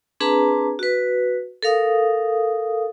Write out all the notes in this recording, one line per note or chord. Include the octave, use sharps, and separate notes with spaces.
C4 D4 G#4 B4 A5 A#5
F#4 B4
A4 A#4 F5 D#6